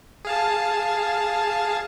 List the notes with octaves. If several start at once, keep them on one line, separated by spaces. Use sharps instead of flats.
G#4 F5 A5